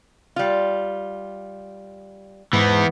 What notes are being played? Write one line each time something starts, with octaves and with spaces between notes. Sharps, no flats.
G3 F4
G#2 E3 B3